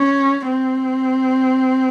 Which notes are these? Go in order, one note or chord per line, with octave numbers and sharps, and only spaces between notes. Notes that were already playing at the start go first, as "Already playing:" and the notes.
Already playing: C#4
C4